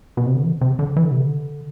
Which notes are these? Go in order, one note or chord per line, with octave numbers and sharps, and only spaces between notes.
B2
C3
D3
E3
C3
D3
E3
D3
C3
D3